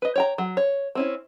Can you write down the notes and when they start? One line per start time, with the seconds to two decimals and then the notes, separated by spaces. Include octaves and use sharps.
0.02 B4 D#5
0.16 C#5 G5 A#5
0.38 F#3
0.57 C#5
0.95 C4 C#4 E4